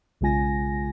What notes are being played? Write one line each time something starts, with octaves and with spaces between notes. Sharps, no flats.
B1 C#3 G#3 F4 G#5 A#6